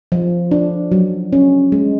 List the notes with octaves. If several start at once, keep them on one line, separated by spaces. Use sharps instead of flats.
F3
D4
F#3
C#4
G#3